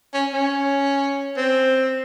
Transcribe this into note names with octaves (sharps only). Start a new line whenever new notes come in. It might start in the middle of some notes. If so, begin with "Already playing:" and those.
C#4
C#4
C4